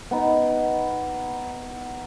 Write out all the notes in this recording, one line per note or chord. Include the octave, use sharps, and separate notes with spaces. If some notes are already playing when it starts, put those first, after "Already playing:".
B3 D#4